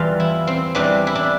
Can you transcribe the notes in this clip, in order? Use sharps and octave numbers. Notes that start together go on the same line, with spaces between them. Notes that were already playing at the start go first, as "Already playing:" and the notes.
Already playing: E2 E3 G3 F4
E4
C4
E2 E3 G3 D4
E4
D4